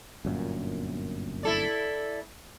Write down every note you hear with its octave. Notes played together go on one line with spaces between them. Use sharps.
G1 F#2 A#2
E4 A4 D5